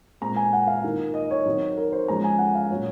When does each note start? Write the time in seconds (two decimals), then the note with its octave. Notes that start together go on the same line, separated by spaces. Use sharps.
0.21 A#2 G#3 C4 A#5
0.36 G#5
0.53 F#5
0.67 F5
0.83 D#3 A#3 F4
1.14 D#5
1.31 C#5
1.46 D#3 F#3 C4
1.77 A#4
1.92 C5
2.08 F3 G#3 C#4 A#5
2.24 G#5
2.38 F#5
2.55 F5
2.70 A#2 F#3 C#4 F4 C#5